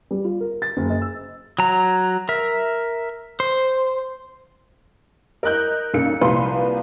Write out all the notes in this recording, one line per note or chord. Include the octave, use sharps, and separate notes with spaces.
G3
F4
A#4
A6
F#1
D#5
E6
F#3 A#5
A#4 E5
C5
A#4 D#5 F#6 G6
B1 C#3 A#3 C#7
C2 A#2 F3 B4 C6